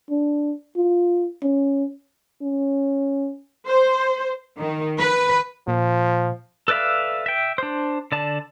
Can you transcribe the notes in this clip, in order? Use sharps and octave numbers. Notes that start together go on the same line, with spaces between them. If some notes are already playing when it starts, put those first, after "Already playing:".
D4
F4
C#4
C#4
C5
D#3
B4
A#2 F3
A4 B4 D5 E5 F5
E5 G5
D4 C5
D3 D5 A5